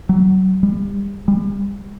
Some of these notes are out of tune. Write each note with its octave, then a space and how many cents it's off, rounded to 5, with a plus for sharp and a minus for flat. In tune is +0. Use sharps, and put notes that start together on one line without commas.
F#3 +30
G3 +35
G3 +40